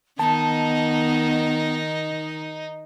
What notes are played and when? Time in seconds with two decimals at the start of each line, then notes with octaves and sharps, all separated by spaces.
0.19 D#3 B3 D#4 D#5 A5